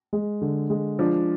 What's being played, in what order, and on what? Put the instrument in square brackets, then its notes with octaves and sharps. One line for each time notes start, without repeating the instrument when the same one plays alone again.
[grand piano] G#3
D3
G#3
[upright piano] F3 [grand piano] D4